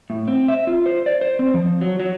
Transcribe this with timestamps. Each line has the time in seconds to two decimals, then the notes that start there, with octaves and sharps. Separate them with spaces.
0.10 A2
0.28 C4
0.48 E5
0.67 F4
0.86 C5
1.06 D5
1.21 C5
1.39 C4
1.54 F3
1.81 F#3
2.00 F#3